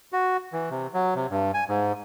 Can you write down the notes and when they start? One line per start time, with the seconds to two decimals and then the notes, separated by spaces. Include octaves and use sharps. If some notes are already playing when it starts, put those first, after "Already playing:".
0.13 F#4
0.53 E3
0.71 C3
0.94 F#3
1.15 C3
1.31 G2
1.54 G#5
1.69 G#2